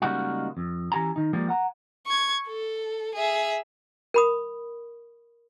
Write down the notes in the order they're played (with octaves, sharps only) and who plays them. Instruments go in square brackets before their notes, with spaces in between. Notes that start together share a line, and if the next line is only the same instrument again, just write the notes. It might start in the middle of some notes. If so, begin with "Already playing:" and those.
[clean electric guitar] C#3 G3 G#3 A#3 D#4 F#4
F2
E3 C#4 G4 G#5 A#5
D#3 D#4
F3 G3 G#3 A#3 G4
F#5 A#5
[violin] C#6 G#6
A4
G#4 E5
[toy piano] A#4 B5 D#6